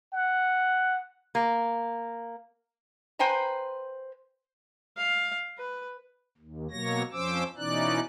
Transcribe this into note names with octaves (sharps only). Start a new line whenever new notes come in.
F#5
A#3
B4 C5 G5 G#5 A#5
F5
B4
D#2
B2 F#3 A#3 C#5 A#6
F2 F3 C#4 C5 D6 E6
B2 E3 C#4 D#4 D5 F#6